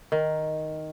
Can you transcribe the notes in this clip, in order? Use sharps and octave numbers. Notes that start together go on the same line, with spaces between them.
D#3